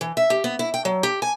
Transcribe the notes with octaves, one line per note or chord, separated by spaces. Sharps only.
E3
E5
G4
B3
E4
G5
F#3
G4
G#5